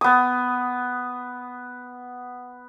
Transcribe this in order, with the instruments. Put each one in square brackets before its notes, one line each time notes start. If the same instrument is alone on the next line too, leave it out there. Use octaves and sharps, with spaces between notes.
[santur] B3 D#6